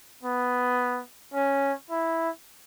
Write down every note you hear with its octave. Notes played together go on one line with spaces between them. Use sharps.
B3
C#4
E4